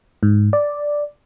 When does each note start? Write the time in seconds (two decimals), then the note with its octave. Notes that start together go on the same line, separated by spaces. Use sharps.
0.23 G#2
0.53 D5